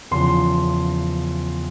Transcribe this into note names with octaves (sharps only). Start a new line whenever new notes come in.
E2 C#3 F3 C6